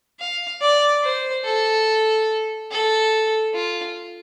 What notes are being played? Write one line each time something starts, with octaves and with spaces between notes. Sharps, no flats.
F5
D5
C5
A4
A4
F4